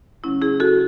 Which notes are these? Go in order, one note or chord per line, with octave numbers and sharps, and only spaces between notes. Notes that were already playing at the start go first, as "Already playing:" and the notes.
C#3 F#3 A3 C#4 E4
E4 G#4
F#4 A4